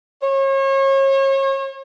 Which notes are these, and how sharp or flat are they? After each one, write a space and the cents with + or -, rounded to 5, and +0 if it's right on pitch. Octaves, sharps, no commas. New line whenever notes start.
C#5 -35